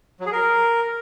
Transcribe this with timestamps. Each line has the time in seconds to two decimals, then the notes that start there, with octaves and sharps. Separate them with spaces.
0.20 F#3
0.26 G#4
0.32 A#4